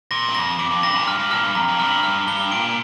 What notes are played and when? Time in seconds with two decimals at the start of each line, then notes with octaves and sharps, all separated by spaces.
0.11 A#2 A#6
0.29 G2
0.35 F2 A#6
0.59 F2 D6
0.71 F2
0.83 G2 A#6
0.95 A#2
1.07 G2 F6
1.19 G2
1.31 A#2 F6
1.43 G2
1.55 F2 A#5
1.68 F2
1.79 G2 F6
2.03 G2 F6
2.27 G2 G7
2.52 A#2 D7